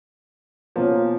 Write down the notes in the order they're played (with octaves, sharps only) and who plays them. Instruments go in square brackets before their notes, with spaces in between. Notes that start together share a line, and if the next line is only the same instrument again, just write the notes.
[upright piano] B2 A#3 C#4 F4 [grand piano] F3